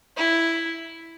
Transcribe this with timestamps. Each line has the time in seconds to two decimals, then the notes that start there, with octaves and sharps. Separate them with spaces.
0.17 E4